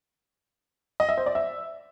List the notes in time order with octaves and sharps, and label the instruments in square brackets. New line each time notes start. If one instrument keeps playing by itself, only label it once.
[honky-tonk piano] D#5
E5
C5
D5
E5